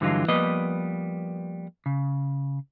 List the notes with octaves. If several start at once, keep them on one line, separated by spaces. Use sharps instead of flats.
G2 D3 E3 F#3 G#3 F4
F3 G3 A#3 B3 B4 D#5
C#3